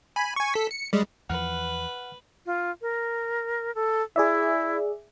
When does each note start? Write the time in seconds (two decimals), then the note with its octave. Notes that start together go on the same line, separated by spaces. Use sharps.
0.16 G#5 B5
0.36 G#5 C#6
0.54 A4 B6
0.71 C#7
0.93 G3 G#3
1.30 E2 F3 B4 F#5 F6 F#6
2.46 F4
2.82 A#4
3.75 A4
4.16 E4 G#4 D5 E5